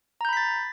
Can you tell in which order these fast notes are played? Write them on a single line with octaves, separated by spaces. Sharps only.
A#5 G6 B5 B6 A6